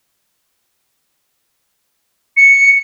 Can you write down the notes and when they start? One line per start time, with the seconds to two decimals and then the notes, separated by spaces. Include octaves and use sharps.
2.37 C#7